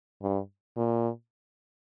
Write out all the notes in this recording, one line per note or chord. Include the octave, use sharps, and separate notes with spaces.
G2
A#2